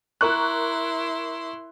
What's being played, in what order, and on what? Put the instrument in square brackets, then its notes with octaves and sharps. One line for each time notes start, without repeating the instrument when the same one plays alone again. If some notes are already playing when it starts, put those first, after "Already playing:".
[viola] E4 C6 [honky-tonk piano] A#4 C#6 F#6